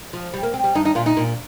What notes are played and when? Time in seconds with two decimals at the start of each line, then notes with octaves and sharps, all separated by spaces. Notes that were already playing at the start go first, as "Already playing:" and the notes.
0.13 F3
0.34 G3
0.43 A#3
0.54 C4
0.64 G3
0.75 G2 D#4
0.85 D#4
0.95 A#2 F4
1.06 D#4
1.17 A#2